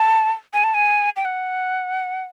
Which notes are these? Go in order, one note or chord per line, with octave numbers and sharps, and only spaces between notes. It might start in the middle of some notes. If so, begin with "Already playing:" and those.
Already playing: A5
G#5
A5
G#5
G5
F#5